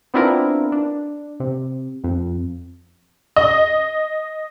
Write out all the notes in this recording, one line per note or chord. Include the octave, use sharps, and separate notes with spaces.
B3 C4 D4 E4 F4 A#4
D4
C3
F2
D#5